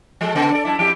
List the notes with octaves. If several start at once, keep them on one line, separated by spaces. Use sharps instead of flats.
F3 G#3 A4
C#3 B3 A4
A4 D5
F#2 E4
F2 E4 G4